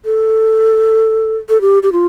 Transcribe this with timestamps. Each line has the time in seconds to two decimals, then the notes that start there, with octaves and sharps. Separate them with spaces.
0.05 A4
1.49 A4
1.61 G4
1.83 G4
1.92 F4